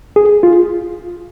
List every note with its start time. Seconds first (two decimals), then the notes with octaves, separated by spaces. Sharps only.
0.16 G#4
0.43 F4